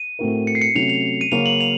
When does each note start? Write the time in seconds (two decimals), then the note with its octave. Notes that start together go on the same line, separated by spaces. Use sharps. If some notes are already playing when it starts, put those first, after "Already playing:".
Already playing: D#7
0.19 A2 A3 C4 F#4 A#4
0.47 C#7
0.55 C7
0.61 C#7
0.75 C3 F#3 A3 C#4 F7
0.90 F7
1.21 D#7
1.32 C#3 F#3 A#3 C#4 F#4 F7
1.46 F#7
1.61 F7